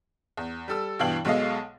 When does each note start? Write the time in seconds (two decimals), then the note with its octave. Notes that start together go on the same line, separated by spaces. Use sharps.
0.37 E2
0.68 G3 A4 E6
0.99 G2 B2 E3 F5 G5 F#7
1.25 B1 B2 G#3 A4 D#5 F5